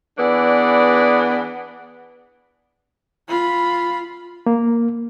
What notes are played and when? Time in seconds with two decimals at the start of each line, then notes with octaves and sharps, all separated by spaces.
0.18 E3 B3 D4 G#4 D5
3.28 F4 B5
4.46 A#3